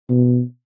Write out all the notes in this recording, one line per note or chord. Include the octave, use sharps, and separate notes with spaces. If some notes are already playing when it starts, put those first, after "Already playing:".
B2